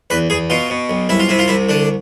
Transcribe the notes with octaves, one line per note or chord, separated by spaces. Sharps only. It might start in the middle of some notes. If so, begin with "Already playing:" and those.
E2 B4
E2 G#4
B2 F4
B2
B1
C2 E4
F4
C3 E4
F4
C2 E4
D3 D4